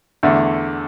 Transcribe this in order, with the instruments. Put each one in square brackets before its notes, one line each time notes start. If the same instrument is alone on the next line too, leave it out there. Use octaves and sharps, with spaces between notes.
[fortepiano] E2 D3 A3